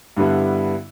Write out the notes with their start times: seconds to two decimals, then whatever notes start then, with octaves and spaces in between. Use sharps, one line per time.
0.17 G2 D3 G3 B3 E4